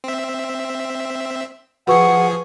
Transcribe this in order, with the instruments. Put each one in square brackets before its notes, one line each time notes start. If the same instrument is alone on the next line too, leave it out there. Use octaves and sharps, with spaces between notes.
[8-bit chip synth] C4 E5
[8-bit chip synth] F3 G#4 [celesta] F#4 B4 C#6 [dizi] F#5